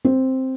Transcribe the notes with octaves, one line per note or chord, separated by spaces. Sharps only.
C4